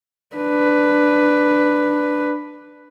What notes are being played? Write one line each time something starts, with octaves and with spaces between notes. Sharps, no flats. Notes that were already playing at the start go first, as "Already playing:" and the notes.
D4 B4